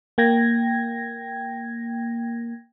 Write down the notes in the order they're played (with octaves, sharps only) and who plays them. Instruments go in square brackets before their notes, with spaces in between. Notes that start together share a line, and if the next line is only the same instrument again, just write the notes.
[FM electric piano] A#3 G5 G#6 A#6